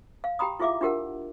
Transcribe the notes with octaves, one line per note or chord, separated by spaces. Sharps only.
F5
G4 G5 A#5 B5 D#6
E4 F4 G#4 E5 F5 D6
D4 F4 G4 A#4 F#5